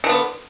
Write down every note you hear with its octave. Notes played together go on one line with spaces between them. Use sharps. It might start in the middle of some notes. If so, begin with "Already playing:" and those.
D3 F3 B3